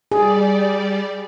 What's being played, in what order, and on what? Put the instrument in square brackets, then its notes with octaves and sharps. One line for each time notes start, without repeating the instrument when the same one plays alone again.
[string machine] G3 D5 [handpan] G#4